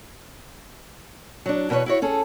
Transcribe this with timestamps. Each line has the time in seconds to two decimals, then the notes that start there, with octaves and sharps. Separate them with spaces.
1.46 F#3 D4
1.69 E2 B2 A#4 B4 C#5
1.86 E4 F#4 C#5
2.02 C#4 G#4 A4